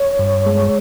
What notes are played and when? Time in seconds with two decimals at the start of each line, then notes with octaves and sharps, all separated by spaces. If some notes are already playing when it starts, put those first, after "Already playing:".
Already playing: C#5
0.19 G2
0.46 G#3